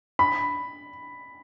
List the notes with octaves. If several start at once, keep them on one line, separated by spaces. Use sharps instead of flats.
B5